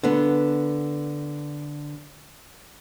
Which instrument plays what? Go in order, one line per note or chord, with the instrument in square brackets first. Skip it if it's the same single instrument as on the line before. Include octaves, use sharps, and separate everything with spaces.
[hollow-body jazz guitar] D3 B3